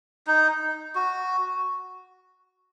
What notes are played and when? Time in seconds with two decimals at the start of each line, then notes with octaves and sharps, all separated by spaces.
0.27 D#4
0.95 F#4